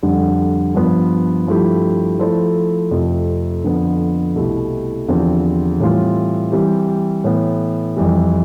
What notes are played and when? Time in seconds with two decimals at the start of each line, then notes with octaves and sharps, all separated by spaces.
0.03 F2 D3 G3
0.74 G2 F3 B3
1.47 G2 F3 A3 E4 G4
2.19 F3 A3 E4 A4 C5
2.91 F2 C3 F3 A3
3.64 F2 D3 F3 B3
4.35 C2 B2 A3 E4 G4
5.08 E2 D3 F3 C4 G4
5.80 A2 E3 G3 C4 F4
6.52 E3 G3 C4 G4
7.24 A2 E3 B3
7.97 F2 E3 G3